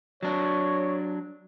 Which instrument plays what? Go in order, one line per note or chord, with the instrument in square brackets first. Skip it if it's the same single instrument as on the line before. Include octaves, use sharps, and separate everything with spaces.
[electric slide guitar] F#3 D4 [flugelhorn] C#5